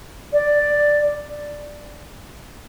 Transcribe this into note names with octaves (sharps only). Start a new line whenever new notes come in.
D5